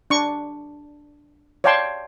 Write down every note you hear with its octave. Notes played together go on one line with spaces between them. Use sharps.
D4 C#6
C#5 D5 F5 G5 A5 C6